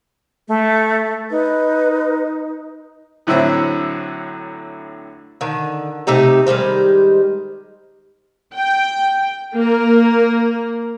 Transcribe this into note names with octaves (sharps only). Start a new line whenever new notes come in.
A3
D#4 B4
A2 D3 F#3 C4 E4 E5
D3 D#3
C3 A3 D#4 G4
D#3 G3 G#3 C5
G5
A#3 A#4